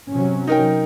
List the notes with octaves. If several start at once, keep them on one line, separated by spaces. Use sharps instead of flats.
C3 F#3 C#4
D#4 A#4 G5